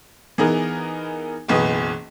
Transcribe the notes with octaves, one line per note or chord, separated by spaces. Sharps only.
E3 B3 D#4 G#4 A#4
F#1 B1 E3 B4 D#6